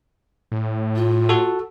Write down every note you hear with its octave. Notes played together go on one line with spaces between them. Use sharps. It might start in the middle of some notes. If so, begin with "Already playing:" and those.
A2
F4
F#4 A4